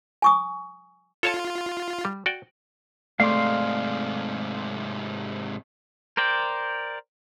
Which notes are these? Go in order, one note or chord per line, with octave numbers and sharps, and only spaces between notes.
G#5 C#6 D#6
F4 A4 C#5 A5
G3
F#4 D5 G5
G#2 C3 A3 D5 F5 C6
A#4 C5 D5 G5